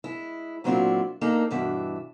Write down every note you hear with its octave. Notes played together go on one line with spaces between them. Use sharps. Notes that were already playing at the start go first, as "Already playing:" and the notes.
G#3 E4
A#2 F#3 C4 D4 E4 F4
A#3 D4 D#4 A4
G2 B2 E3 D4 E5